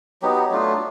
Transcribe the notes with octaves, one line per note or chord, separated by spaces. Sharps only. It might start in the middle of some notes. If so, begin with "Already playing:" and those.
F#3 B3 D#4 G4
F#3 A3 D4 F4